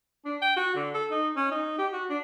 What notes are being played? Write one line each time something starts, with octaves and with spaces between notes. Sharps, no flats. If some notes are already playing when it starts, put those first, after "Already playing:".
D4
G5
F#4
D3
A4
D#4
C#4
D#4
G4
F#4
D4